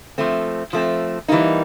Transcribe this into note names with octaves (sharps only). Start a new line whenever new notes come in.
F3 A3 C4
F3 A3 C4
E3 G3 A#3 D#4